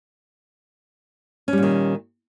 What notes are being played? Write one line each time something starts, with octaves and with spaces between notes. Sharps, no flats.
A#2 D#3 G3 C#4